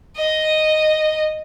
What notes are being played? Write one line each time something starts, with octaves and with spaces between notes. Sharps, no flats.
D#5